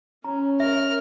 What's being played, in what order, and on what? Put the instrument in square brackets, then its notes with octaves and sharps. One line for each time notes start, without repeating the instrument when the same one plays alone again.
[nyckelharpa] C#4 [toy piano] A#5
[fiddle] A#4 F6 [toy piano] E5